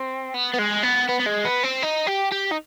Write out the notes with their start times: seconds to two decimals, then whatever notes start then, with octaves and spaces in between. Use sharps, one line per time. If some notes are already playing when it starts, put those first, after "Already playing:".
Already playing: C4
0.34 B3
0.54 B3
0.59 G#3
0.83 B3
1.09 B3
1.20 B3
1.26 G#3
1.45 B3
1.63 C4
1.83 D#4
2.07 G4
2.31 G4
2.51 D#4